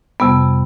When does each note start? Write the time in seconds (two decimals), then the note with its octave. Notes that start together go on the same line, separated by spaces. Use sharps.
0.20 F2 C3 G3 B3